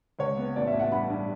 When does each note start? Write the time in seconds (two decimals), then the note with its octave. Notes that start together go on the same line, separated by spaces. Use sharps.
0.19 C#2 C#5
0.37 B3
0.56 A1 D5
0.67 E5
0.74 A1
0.79 F#5
0.91 G2 B5
1.10 G2